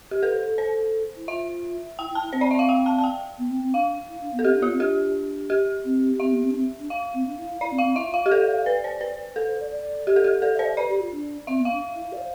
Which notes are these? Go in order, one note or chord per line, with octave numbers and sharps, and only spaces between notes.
G4
A4 B4
C5
A4
C5
E4
F4 E5
E4 G5
E4
A5
E4
C4 C5
D5
E5
F5
G5
A5
A5
G5
B3
C4
C4
D4 F5
E4
D4
B3
A4
C4 G4
D4
B3 F4
C4
D4 G4
G4
C4
C4 E5
B3
C4
D4
C4
D4
F5
C4
D4
E4
E4
E4 D5
C4
F5
C4
E4 E5
F4
F5
G4
A4 D5
B4 D5
C5
B4
A4
C5
D5
D5
G4
A4
G4
A4 D5
E5
C5
D5
B4 D5
G4
F4
D4
C4 E5
B3
F5
D4
E4
E4
D5
C5